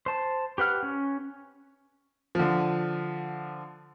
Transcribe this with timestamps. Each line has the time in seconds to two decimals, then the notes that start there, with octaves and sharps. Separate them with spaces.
0.06 C5 A5
0.58 G4 B4 F#5 F6
0.83 C#4
2.35 D3 F3